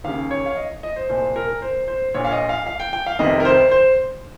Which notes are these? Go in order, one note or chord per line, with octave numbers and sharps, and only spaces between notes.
D#2 C#3 F5
C#5
F5
D#5
D#5
C5
C2 A#2 C5
A#4
C5
C5
A#1 A#2 C#5
F5
D#5
F5
F5
G5
G5
F5
F1 F2 C3 D#3 D#5
A#4
C5
C5